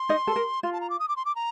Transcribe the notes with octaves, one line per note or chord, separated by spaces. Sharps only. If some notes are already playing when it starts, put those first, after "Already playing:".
Already playing: C6
D#4 D#5
A4
A#4
F4 C6
A5
A#5
D6
D#6
D6
C6
D6
A#5